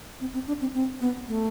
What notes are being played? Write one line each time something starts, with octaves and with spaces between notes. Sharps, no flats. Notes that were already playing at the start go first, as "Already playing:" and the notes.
C4
C4
D4
C4
C4
B3
A3